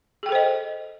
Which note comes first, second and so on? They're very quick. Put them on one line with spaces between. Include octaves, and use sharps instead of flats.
G#4 G5 A4 C5 D#5